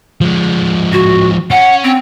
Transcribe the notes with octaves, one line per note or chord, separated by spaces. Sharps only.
F3 G#3
F#4
C#4 F#5
C4